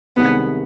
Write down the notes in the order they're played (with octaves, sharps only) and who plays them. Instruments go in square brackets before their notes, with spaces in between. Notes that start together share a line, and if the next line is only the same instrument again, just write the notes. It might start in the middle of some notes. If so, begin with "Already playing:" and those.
[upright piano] C2 C3 D#3 G#3 [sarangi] B3